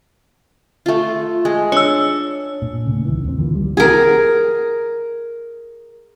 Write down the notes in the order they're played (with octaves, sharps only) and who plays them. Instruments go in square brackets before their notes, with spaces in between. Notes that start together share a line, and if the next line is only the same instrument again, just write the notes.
[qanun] A3 F4
G#3
[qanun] D4 [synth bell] C#5 E6
[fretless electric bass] A#2
A2 C#3
C2 D#3 E3
D#2 C4
D3 E3 F3 A#3
C2 D#3 G3
[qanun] G#4 A#4